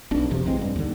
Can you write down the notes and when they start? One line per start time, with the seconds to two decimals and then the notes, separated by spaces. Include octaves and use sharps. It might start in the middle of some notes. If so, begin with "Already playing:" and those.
0.11 E1 B1 D4
0.31 G#1 F2 C3 F3
0.45 A#1 E2 G#3 C4
0.61 G2
0.76 D#2 D3